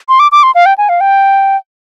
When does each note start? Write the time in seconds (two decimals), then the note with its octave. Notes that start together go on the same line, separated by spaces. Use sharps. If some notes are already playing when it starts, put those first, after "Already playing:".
0.09 C6
0.20 D6
0.32 D6
0.43 C6
0.55 F5
0.66 G5
0.78 G#5
0.89 F5
1.01 G5